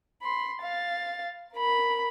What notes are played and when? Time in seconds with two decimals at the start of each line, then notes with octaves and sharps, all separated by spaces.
0.22 B5 C6
0.62 F5 A6
1.54 A#4 B5